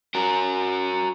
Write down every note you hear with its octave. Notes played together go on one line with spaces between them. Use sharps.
F#4 A#4